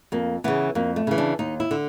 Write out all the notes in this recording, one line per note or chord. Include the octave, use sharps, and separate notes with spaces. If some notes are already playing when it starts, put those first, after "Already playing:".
F2 A#3
C#3 E3 B3
F2 A#3
A3
C#3 E3
D4
D#2 D#4
E4
D3